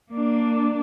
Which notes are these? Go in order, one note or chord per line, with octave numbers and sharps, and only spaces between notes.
A#3 D4